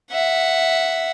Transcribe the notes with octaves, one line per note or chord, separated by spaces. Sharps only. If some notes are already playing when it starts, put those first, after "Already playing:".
E5 F#5